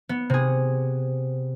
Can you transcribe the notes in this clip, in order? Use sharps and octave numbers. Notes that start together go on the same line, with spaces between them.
B3
C3 G#4